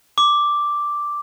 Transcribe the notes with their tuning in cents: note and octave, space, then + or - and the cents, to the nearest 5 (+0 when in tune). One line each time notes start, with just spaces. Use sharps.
D6 +0